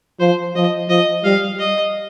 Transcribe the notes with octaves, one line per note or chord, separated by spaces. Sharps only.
F3 C5
F3 D#5
F3 D#5
G3 F5
D#5